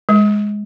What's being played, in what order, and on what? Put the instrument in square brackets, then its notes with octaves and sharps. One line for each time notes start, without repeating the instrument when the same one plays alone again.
[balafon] G#3